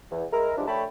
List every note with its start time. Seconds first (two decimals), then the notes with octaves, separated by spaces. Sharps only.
0.11 E2
0.32 G#3 E4 A#4
0.56 E3 F3 G3 G#3 D4
0.68 D3 A3 C#5 G5 A5 B5